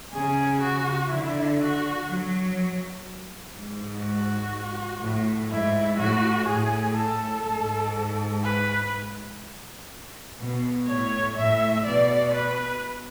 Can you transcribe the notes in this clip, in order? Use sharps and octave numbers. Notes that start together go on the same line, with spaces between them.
C#3 G#4
F#4
D3 E4
F#4
F#3
G#2
F#4
A2
G#2 E4
A2 F#4
A2 G#4
A4
G#2
B4
B2
A2 C#5
A2 E5
B2 D5
B4